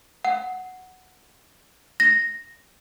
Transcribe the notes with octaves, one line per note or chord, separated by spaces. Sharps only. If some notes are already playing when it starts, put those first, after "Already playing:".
F#5
A#6